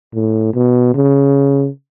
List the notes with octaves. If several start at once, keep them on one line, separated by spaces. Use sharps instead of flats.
A2
B2
C#3